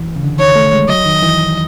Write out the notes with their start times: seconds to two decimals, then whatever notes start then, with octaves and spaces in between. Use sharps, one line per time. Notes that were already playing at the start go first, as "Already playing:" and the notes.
Already playing: E3
0.16 C#3
0.23 D3
0.39 D#3 C#5
0.56 A3
0.73 G#3
0.89 F#3 D#5
1.06 D#3
1.22 E3